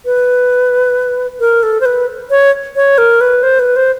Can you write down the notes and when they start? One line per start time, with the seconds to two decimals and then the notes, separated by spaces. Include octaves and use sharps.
0.06 B4
1.40 A#4
1.63 A4
1.81 C5
1.85 B4
2.30 C#5
2.76 C#5
2.98 A#4
3.21 B4
3.43 C5
3.59 B4
3.76 C5